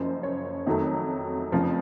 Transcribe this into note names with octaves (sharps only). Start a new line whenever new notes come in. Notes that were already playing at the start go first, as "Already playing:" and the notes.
Already playing: F#1 F#2 F3 C5
C#5
F2 D#3 F#3 A3
F1 F2 C#3 F3